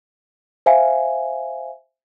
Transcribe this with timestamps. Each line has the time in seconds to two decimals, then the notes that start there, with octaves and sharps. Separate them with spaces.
0.66 C5 E5 F5 G#5